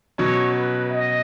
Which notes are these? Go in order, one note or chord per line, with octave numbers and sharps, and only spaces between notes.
B2 F#3 C#4 C#5
B4
D#5